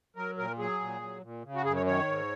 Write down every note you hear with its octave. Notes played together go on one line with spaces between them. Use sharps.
F#3 A#4
A#2 A#4
F#3 G#4
A#2
F#3
A#2
C#3
F#4
F#2 G#4
C#5
D#3 C#5
G#2